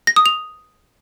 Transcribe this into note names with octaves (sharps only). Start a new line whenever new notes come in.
A#6
D#6
F7